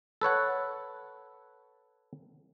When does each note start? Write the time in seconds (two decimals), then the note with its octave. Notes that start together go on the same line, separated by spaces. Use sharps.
0.21 A4 B4 C#5 F#5